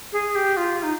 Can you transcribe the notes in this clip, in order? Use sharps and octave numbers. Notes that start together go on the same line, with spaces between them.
G#4
G4
F4
D#4